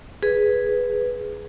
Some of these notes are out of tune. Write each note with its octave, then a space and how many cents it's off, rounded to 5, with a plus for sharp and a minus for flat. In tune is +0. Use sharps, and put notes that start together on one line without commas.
G#4 +0 B4 +0